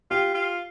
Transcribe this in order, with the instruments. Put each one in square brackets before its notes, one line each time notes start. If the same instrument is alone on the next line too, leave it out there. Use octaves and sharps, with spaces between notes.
[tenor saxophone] F4 [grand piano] G4
[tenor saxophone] F4